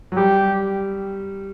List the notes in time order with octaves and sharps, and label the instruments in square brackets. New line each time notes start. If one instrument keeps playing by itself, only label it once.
[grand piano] F#3
[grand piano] G3 [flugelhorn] G4